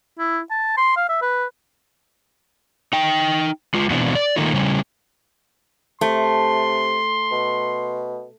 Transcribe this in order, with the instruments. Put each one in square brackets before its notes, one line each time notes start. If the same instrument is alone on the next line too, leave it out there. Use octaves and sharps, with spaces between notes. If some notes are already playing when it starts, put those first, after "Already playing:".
[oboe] E4
A5
C6
F5
E5
B4
[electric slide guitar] D#4 G5
G#3 F4
B2 E3 B3 C4 D4 E4
D5
D3 D#3 A3 A#3 D#4 F4
C#3 G3 C#4
[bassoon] C3 [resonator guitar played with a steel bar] A3 [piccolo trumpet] C6
[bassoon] B2